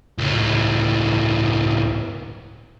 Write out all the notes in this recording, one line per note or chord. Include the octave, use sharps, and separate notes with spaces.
C#2 A2